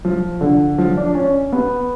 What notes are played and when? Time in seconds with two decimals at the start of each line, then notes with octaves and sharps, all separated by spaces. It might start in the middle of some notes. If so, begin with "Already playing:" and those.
0.05 F3
0.41 D3
0.78 F3
0.97 D4
1.15 C#4
1.52 B3